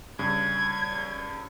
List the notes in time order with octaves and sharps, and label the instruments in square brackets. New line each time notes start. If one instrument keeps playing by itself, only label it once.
[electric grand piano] G2 C#3 [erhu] G#6